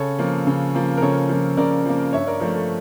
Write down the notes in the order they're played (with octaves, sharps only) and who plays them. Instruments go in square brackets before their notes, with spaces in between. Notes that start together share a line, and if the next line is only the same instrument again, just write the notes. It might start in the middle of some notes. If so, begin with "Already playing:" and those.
Already playing: [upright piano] C#3 A4 C#5
F3 A#3
C#3
F3 A#3
A#4
C#3 A4 C#5
F3 A#3
C#3 A#4 D5
F3 A#3
G2 C#5 E5
A#4 D5
F3 A3 A#4
A4